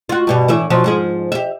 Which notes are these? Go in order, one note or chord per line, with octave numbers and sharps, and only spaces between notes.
F4 F#4
G2 B2 G3
A2 E3 E5
B2 F3 F#3
G#2 F3 G#4
G4 E5